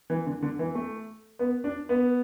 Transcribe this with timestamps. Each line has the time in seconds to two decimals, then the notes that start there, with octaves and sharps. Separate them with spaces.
0.10 E3
0.27 D3
0.42 D3
0.59 E3
0.75 A3
1.39 B3
1.64 D4
1.89 B3